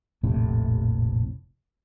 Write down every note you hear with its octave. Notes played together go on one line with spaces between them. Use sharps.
F1 A#1 A2 C3